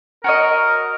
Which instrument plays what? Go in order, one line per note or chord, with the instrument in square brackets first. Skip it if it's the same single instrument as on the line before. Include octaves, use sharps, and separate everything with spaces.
[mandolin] F#4 C#5 D#5 [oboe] A#4